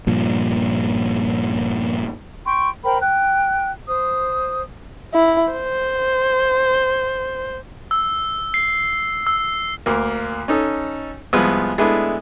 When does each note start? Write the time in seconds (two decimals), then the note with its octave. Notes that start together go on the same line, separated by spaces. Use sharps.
0.07 G2 A#2 F3
2.45 G5 C6 C#6
2.83 A#4 C5 G5 B5
3.00 G5 F#6
3.88 C5 D#6
5.14 E4
5.53 C5
7.91 E6
8.54 C7
9.27 E6
9.86 D2 A#3
10.48 C#4 D#4 A4
11.33 C2 F3 G#3 B3
11.78 G#3 A3 B3 D4 E4